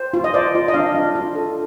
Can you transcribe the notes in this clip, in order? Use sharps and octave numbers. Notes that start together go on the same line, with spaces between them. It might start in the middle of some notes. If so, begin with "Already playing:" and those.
Already playing: C5
F4
D#5
C5 D5
F4
D#5
D4 F5
D4
F4
A4